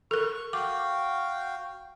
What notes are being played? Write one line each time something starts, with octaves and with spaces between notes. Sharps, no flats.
A4 A#4 C#6
F#4 F5 G5 D6